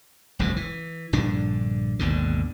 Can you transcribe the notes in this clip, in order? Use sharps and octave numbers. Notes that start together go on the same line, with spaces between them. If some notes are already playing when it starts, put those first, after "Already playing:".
F#1 C#2 G#2 B2
E3
A#1 G2 D3 D4
G#1 D#2 B2 D3